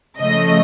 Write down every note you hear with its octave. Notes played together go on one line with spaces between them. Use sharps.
C#3 F3 A3 D#5